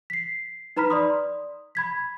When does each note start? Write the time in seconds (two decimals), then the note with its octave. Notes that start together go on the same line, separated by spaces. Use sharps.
0.10 B6 C7
0.77 D#4 B4 A#5 B5 F6 B6
0.90 D5 C6 D#6
1.75 B5 G#6 B6